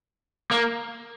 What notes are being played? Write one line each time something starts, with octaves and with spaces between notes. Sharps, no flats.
A#3